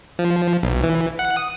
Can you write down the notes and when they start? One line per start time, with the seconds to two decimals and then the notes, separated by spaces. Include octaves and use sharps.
0.19 F3
0.63 B1
0.84 E3
1.19 F#5
1.37 D#6